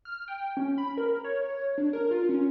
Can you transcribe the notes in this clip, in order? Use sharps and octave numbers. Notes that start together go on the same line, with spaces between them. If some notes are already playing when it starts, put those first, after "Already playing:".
F6
G5
C#4
B5
A#4
C#5
D4
A#4
F4
C#4